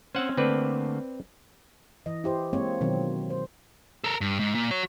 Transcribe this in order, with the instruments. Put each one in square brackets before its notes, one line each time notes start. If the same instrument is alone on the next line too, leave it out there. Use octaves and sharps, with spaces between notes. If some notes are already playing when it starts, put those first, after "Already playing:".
[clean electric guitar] C4 C#4 [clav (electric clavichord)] C5 F#5
[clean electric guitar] D3 A3 A#3 [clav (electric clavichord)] C4 B4 D5
[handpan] E3 D#5
E4 G4 C5
G#3 A#3 C4 C#5
B2 D#3 F#3 C4
C5
[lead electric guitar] A4 A#4
G2
G#2
A#2
F#4 C#5